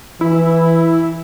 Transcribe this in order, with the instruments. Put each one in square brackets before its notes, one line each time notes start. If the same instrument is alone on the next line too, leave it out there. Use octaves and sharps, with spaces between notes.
[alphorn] E3 [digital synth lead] E4